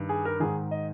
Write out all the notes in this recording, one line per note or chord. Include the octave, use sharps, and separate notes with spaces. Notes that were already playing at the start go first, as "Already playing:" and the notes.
Already playing: G2 D#3
G#4
A#4
G#2 D#3 G#4
D#5